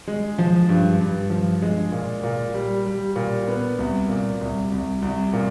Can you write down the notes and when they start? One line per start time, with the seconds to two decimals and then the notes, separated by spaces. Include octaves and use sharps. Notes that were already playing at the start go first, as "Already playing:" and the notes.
0.08 G#3
0.38 F3
0.69 G2
1.00 G2
1.30 F3
1.62 G#3
1.92 A#2
2.24 A#2
2.54 G3
2.86 G3
3.16 A#2
3.48 B3
3.78 C2
4.09 A#2
4.41 C2
4.72 C2
5.02 C2
5.33 A#2